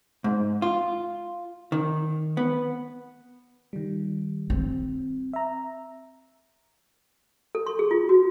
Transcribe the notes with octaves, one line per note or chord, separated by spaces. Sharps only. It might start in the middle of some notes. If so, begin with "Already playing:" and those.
G#2
F4
D#3
B3
D#3 G3
C4
E5 A#5
A4
C6
G#4
F4
F#4